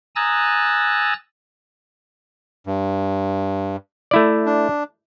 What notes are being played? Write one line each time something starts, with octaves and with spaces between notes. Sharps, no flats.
G#5 A#5 D#6 E6 F#6 A6
G2
A3 E4 D5
D4